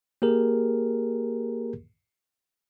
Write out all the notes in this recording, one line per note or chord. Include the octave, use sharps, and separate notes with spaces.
A#3 G4 G#4 A#4